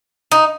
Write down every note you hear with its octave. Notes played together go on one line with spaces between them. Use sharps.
D#4